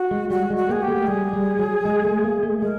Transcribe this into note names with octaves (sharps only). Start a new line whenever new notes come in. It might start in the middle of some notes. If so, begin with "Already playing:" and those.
Already playing: F#4
G#3
G3 F#4
G#3
F#4
A#3 G#4
G4
A3
G3 G#4
G3
F#3
G#3
A3
A#3
A3
G#3 A#4